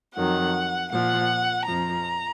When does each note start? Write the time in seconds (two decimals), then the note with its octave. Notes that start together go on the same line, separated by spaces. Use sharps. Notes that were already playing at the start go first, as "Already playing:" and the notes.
0.15 F2 D#3 F#3 F#5
0.91 A#2 F3 F#5
1.67 F2 F3 A#5